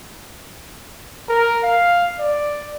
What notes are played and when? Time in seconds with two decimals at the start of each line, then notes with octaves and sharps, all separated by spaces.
1.29 A#4
1.63 F5
2.19 D5